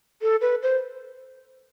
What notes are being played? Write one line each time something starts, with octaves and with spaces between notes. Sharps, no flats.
A4
B4
C5